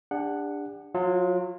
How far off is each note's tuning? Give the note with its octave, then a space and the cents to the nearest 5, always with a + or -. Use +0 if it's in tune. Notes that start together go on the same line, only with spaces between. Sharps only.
D4 +0 G4 +45 F#5 +0
F#3 -30 F4 +0